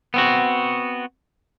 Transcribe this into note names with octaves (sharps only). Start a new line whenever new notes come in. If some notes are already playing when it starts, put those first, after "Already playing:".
B3 C4 F#4